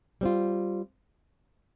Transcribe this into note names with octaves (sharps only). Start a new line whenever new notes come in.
G3 C4 F4